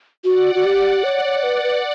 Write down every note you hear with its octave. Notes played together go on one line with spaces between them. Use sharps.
F#4 D5 F#5
F#4
G4
C#5
C#5
B4
B4